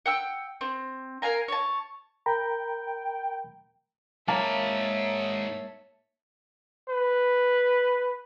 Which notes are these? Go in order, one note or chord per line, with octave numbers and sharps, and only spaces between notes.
F#5 G5 E6
C4
A#4 F5 G#5 A#5
C#5 A5
A#4 G5 A#5 B5
G#2 A#3 C#5 E5 A5 B5
B4